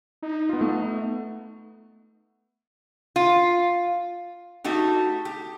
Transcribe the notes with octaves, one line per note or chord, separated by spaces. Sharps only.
D#4
B3 F4
A3 B3
F4
A3 D#4 F#4 G4
G4